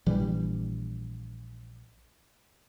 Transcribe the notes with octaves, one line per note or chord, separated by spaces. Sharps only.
A#1 E3 G3